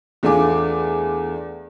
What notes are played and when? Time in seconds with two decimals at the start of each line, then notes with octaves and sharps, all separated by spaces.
0.23 E2 A3 D4 F4 G#5 D6